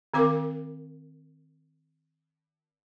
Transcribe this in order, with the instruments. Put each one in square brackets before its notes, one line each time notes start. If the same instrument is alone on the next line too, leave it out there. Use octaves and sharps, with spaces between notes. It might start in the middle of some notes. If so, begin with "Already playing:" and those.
[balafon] D#3 C4 A#4 F5 D6